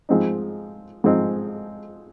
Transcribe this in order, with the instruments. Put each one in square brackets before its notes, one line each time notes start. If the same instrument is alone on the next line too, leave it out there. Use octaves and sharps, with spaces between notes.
[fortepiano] G#2 F3 G#3 C4 D#4
G#2 F3 G#3 C4 D#4